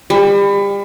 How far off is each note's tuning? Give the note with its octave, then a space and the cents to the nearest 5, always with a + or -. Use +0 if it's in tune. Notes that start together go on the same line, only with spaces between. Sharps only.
G3 +35